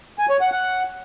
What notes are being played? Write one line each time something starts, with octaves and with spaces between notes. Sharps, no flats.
G#5
C#5
F#5
F#5